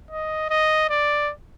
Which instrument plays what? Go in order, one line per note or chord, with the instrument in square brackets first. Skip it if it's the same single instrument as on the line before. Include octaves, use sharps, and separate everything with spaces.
[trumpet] D#5
D#5
D5